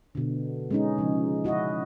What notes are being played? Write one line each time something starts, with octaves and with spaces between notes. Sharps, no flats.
B2 D3
G#3 C#4 D#4
C#3 F3
E4 F#4 G#4 D#5